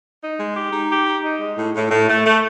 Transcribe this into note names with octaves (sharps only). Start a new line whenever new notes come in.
D#4
G#3
G4
D#4
G4
D#4
D#4
G#3
A2
A2
A2
A3
A3